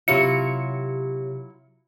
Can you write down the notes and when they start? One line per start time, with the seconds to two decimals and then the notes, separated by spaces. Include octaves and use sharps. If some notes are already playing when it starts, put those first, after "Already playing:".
0.08 C3 F#3 E4 F4 G4 C#5 C#7